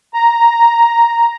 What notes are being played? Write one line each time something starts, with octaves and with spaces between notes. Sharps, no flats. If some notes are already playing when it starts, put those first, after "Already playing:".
A#5